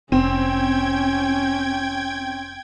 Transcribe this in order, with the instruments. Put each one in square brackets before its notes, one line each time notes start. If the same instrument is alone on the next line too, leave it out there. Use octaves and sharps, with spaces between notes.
[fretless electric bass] F1 [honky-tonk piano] C4 [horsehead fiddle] C#4 [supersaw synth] G5 G#6